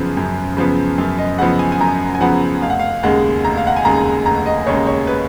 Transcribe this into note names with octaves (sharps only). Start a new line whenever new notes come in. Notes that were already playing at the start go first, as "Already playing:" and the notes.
Already playing: F#2 C#3 F3 B3
F#2
C#3 F3 B3
F#2
D#5
C#3 F3 B3 F#5
G#5
G#5
F#2 A#5
G#5
C#3 F3 B3 F#5
F1 F5
F#5
F5
D#2 C#3 G#3 F#5
F1 A#5
F5
F#5
G#5
D#2 C#3 G#3 A#5
F1 A#5
D#5
D#2 C#3 G#3 C#5
C#5
B4